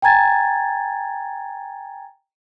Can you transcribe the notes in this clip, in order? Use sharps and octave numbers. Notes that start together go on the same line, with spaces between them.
G5 G#5 A#5 G#6 A6